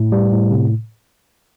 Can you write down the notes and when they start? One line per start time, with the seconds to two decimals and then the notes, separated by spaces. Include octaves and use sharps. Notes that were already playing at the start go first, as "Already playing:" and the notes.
Already playing: A2
0.12 G3
0.32 A2
0.51 C3